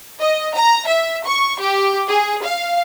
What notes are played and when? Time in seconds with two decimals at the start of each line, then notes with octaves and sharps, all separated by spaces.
0.21 D#5
0.55 A#5
0.88 E5
1.26 C#6
1.61 G4
2.09 G#4
2.44 F5